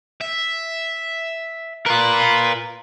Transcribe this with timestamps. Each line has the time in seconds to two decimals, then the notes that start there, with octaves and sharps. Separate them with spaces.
0.21 E5
1.86 F4 A#4 B4